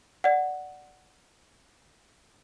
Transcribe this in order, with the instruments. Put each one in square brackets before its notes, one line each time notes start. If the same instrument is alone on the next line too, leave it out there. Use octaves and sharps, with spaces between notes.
[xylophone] D5 F#5